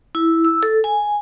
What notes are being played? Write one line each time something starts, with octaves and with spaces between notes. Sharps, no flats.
E4
E6
A4
G#5